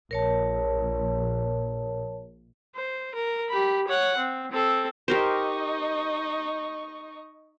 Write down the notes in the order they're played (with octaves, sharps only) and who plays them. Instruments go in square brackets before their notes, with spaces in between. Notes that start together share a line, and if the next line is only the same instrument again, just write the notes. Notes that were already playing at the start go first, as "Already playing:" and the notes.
[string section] A#1 [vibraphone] A#4 C#5 A5
[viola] C5
A#4
G4 B5
C#5 F#5
C4
C4 A4
[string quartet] D#4 D#5 C#6 [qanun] G4 A#4 C5